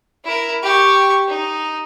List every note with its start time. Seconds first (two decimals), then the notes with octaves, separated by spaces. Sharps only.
0.24 E4 A#4
0.63 G4 C#6
1.28 D#4